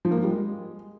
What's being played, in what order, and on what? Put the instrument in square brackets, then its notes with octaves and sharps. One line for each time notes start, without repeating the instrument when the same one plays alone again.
[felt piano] F3
A#3
F3
G3
G#3